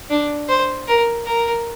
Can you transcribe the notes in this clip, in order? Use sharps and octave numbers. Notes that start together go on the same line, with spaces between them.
D4
C5
A#4
A#4